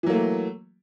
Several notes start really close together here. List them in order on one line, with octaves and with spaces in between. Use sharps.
E3 F#3 A#3 A3